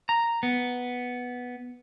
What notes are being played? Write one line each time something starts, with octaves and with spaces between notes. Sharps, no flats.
A#5
B3